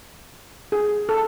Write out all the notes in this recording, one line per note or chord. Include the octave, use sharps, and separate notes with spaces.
G#4
A4